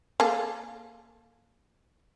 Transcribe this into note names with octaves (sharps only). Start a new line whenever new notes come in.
A#3 G#4 A4